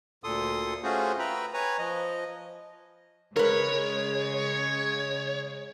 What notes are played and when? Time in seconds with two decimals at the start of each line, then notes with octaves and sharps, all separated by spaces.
0.24 D2 A#2 A4 C6 D#6
0.83 A3 C#4 F4 F#4 G#4 C5
1.19 B4 E5 G5 A#5 B5
1.54 B4 C#5 G#5 A#5
1.78 F3 D#5
3.36 C#3 G#3 A#4 B4 C#5